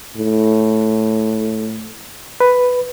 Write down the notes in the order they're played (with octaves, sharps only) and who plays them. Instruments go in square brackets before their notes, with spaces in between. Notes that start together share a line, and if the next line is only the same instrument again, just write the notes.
[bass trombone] A2
[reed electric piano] B4